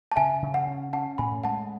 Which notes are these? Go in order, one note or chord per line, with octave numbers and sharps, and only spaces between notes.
A5
C#3 E5 G#5
C#3
F#5
C#4
C#4 F#5 A5
A2 G#5 B5
G#3 F#5 A5